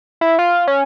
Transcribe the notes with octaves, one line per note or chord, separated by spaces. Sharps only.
E4
F4
C#4